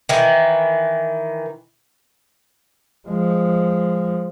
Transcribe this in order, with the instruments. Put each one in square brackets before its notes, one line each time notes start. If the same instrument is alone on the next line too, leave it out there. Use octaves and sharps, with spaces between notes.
[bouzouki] D#3 E3
[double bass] F3 G#3